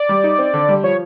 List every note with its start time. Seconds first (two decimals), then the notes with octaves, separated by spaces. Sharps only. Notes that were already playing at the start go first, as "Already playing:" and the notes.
Already playing: D5
0.09 G3
0.24 D#4
0.39 C4
0.54 D3
0.69 G3
0.84 F3 C#5